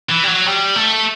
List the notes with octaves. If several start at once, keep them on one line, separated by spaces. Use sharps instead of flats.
E3
G3
F#3
G3
A3